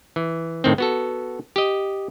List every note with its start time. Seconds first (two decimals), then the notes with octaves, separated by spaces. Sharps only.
0.16 E3
0.64 A2 D#3 C4
0.78 B3 F#4 A4
1.56 G4 D#5